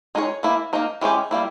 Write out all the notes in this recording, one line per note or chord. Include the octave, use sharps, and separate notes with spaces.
G#3 D#4 A#4 C#5
E3 A#3 E4
A#3 D#4 A#4
E3 G#3 C#4 G4
G3 A#3 E4